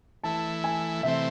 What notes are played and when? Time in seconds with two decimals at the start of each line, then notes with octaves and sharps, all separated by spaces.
0.24 E3 A3 E4 A5
0.64 G#5
1.03 C3 E3 A3 C4 E5